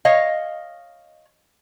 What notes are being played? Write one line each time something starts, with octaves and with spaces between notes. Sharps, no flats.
C#5 D#5 F5